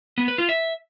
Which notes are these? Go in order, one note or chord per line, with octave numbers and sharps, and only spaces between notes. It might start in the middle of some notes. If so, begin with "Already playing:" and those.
B3
B4
F4
E5